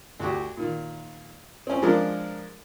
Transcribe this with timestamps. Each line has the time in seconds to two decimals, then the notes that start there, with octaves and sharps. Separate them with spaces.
0.20 D2 F#4 G4
0.57 A#2 D#3
1.67 C4 C#4
1.82 F3 G#3 D4 A#4